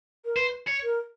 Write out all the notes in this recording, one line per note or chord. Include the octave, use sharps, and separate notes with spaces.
A#4
B4 C5
C#5
A#4